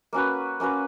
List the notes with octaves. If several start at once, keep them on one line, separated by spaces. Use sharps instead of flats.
A#3 C#4 F#4 B4
A#3 C#4 F#4 B4